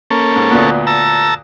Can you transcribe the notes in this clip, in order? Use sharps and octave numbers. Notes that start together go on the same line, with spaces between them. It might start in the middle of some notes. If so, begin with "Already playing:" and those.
A#3 C#4 A4
G#2
D2 A#2 B3
A5 A#5 E6